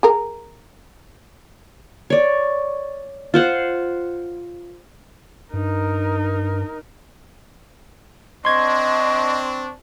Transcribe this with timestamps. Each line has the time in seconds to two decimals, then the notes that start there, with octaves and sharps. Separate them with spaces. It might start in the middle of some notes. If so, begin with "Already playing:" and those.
0.03 G#4 A#4
2.10 C#5 D5
3.34 F4 C5 F#5
5.54 G2 D#4 A#4
8.45 C4 D4 D#5 C6 C#6 G#6